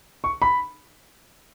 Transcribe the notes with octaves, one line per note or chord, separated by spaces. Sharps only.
C#6
B5